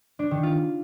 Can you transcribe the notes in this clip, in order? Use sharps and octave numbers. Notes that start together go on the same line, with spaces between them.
D4
D#3
F4